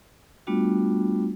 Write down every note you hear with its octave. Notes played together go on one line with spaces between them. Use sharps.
G3 A3 B3 D4 F4 F#4